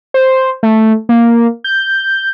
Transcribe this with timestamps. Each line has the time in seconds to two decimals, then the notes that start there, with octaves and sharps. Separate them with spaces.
0.14 C5
0.63 A3
1.09 A#3
1.64 G6